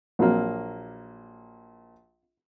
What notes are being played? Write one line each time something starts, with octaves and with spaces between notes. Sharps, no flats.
A#1 F#3 A#3